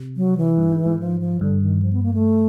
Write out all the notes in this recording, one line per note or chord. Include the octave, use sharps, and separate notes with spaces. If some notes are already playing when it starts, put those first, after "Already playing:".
Already playing: C3
F#3
E3
G2
G#2
G#2
F3
F3
G2 D3
D#3
F3
B3
A#3
A3